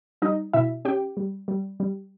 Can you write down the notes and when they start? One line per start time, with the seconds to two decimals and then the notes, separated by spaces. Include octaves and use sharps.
0.22 G3 D#4 D#5
0.53 B2 E4 E5
0.85 C#4 G4 G5
1.17 G3
1.48 G3
1.80 G3